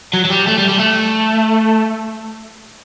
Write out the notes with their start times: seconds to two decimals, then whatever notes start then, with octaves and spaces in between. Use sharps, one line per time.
0.14 F#3
0.25 F#3
0.30 G3
0.47 A3
0.58 G3
0.69 G3
0.79 A3